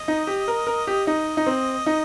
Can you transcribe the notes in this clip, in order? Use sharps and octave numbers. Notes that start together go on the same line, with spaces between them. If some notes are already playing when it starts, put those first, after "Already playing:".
Already playing: D#5
D#4
G4
A#4
A#4
G4
D#4 D#5
D#4
C4
D#4